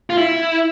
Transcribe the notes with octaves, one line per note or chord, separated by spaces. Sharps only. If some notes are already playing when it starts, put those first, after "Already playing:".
F4
E4